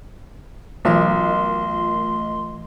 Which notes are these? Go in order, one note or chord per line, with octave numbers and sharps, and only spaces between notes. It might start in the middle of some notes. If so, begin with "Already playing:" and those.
B1 E3 A3 F4 A#4 D#5 C6